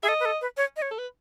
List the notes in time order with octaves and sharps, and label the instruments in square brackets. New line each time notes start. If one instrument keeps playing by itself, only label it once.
[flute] G#4 [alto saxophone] E5
[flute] A4 [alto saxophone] D#5
[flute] B4
A4
B4
C#5
D#5
C#5
[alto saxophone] A4
B4